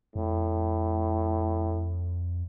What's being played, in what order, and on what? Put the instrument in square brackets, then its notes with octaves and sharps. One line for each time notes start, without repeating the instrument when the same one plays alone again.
[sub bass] F2 [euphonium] A2